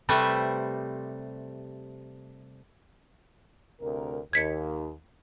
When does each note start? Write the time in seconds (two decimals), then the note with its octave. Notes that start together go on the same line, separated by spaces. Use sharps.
0.09 C3 G3 A3 B4 C5 E5
3.80 D2 C3 A#4
4.33 D#2 G#6 B6 C#7